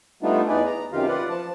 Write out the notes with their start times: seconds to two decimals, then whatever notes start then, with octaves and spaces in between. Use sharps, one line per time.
0.23 G3 A3 B3 D4 D#4 F4
0.48 E2 D#4 G#4 B4 D5 G#5
0.65 A#5
0.92 F#2 C3 D#3 F4 G4 F5
1.08 F4 B4 D5 F#5
1.30 F3 A5